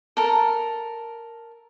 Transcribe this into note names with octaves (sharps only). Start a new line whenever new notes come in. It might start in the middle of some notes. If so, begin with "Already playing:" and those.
A4 A#4